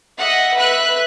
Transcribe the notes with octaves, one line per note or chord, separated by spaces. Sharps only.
D#5 E5 F#5
B4 E5 F#6